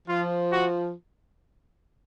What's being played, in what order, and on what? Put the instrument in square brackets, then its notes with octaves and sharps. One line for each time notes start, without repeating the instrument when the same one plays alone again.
[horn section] F3 [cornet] F4
[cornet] F#4